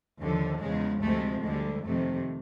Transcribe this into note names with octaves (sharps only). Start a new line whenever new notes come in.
D#2 D3 F3
E2 C#3 F3 G#3
D2 C3 F3 G#3 A3
D2 D3 G3 G#3
F2 C3 D#3 A3